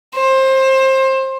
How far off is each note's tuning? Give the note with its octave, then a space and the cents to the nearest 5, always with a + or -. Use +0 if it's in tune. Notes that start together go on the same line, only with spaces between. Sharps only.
C5 +25